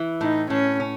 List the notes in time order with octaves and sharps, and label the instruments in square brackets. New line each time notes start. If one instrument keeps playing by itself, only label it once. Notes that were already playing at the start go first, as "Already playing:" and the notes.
Already playing: [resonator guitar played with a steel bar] E3 E4
[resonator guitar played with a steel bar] A2 [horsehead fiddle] D#4
[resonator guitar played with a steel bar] A2 [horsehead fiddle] C#4
[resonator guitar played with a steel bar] C#4